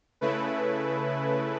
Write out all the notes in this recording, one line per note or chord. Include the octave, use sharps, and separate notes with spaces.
C#3 A3 E4 B4